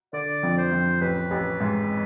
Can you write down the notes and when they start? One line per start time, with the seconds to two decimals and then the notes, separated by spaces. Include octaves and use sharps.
0.13 D3 D5
0.43 F2
0.58 C5
0.72 F2
1.01 A1 B4
1.31 A1
1.60 G#2